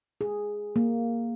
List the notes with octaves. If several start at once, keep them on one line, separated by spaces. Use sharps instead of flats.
G#4
A#3